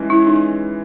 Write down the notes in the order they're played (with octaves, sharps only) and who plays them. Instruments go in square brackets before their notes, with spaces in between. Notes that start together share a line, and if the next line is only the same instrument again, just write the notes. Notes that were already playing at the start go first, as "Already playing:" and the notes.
Already playing: [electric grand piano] E3 G#3 C#4
[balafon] E4
D#4